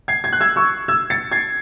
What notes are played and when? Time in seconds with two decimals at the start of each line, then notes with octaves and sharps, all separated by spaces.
0.08 G#6 C7
0.24 G#6
0.33 F#6
0.40 E6 G#6
0.56 C#6 E6
0.88 E6 G#6
1.10 A6 C#7
1.32 G#6 C7